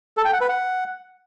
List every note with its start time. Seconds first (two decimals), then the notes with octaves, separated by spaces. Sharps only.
0.17 A4
0.25 G5
0.33 F#5
0.41 B4
0.49 F#5